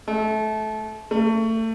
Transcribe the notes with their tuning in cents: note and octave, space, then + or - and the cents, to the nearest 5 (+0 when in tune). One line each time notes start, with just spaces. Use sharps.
A3 -25
A3 +30